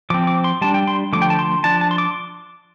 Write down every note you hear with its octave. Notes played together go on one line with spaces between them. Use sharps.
F3 C4 D6
D6
C6
G3 D4 A5
G5
C6
D3 F3 A3 D6
G5
A5
C6
F3 D4 A5
A5
C6
D6